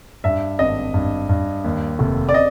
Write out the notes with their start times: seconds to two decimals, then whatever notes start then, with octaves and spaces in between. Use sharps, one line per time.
0.24 G2 E5
0.59 G#1 D#5
0.94 G2
1.29 G2
1.64 D#2
1.99 F1
2.29 D5
2.34 D#5